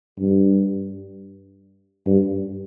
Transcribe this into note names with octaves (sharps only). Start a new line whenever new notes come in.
G2
G2